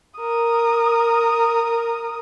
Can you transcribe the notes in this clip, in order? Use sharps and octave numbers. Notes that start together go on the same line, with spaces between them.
A#4 D#6